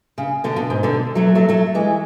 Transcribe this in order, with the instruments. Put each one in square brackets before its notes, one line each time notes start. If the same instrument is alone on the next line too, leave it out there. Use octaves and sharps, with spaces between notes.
[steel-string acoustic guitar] C#3
B2 D3
B2
G#2
B2 D3
F#3 A3
F#3 A3
F#3 A3
E3 G#3